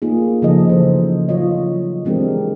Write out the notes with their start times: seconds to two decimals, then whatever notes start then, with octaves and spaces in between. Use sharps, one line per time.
0.02 A#3 D#4 F4 G#4
0.42 C#3 F3 A3 D#4 A4 D#5
0.69 C#3 E3 C5
1.29 F#3 F4 C#5 D#5
2.05 E3 G#3 C4 D4 G4 A#4